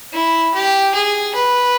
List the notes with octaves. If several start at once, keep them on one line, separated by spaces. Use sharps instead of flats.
E4
G4
G#4
B4